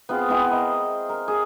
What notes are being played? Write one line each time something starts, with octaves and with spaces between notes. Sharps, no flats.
B3 C4 F4 G#4
B3 C4 E4 G#5
A#4 D#5
A#4
G#4